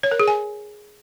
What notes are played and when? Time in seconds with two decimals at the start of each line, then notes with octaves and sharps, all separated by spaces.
0.03 C#5
0.11 A#4
0.20 G#4
0.28 G#5